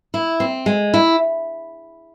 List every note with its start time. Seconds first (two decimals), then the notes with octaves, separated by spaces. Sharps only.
0.14 E4
0.40 C4
0.66 G#3
0.94 E4